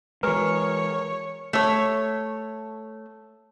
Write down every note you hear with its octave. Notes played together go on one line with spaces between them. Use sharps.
E3 G#3 F#4 G#4 A#4 B4 C#5
A3 C#5